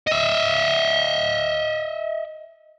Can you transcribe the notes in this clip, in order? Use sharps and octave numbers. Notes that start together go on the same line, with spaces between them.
D#5 E5